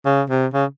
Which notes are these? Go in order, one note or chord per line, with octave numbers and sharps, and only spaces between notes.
C#3
C3
C#3